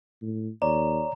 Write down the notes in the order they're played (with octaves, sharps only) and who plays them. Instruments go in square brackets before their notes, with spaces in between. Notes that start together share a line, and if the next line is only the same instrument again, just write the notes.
[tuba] A2
[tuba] D#2 [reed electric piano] C#5 D5 [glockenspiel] A#5